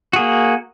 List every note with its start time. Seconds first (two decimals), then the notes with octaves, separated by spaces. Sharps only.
0.13 F#4
0.16 G#4
0.19 A#3